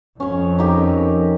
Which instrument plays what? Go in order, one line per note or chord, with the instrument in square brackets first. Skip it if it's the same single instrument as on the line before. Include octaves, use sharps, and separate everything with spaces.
[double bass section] F2 [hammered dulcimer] C#4 C#5
[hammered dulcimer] D#4 G4 A#4